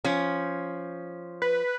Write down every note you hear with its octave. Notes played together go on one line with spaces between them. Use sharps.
F3 C#4
B4